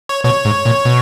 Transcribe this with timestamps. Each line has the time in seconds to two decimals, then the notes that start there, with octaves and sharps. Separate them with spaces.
0.09 C#5
0.24 B2 C#5
0.45 G#2
0.65 A#2
0.85 B2